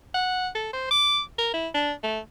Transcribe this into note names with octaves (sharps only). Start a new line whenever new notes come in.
F#5
A4
C5
D6
A#4
E4
D4
A3